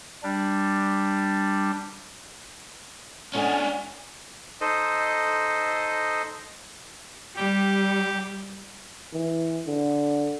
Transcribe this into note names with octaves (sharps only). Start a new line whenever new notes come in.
G3 D4
G#3 C#4 D4 A4 D#5 F#5 G#5
D#4 A4 C5 D#5
G3 G4
E3
D3